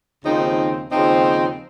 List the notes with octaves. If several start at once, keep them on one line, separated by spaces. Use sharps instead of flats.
D#2 C#3 F3 C4 D#4
D#2 C#3 F3 C4 D#4